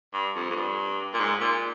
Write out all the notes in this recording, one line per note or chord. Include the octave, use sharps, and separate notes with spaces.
G2
F2
F2
G2
A#2
G#2
A#2